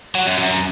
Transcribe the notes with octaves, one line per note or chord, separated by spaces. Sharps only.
F#3
F#2
F#2